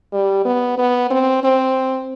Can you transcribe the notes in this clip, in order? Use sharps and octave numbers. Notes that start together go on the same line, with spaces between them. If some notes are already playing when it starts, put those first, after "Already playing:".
G3
B3
B3
C4
C4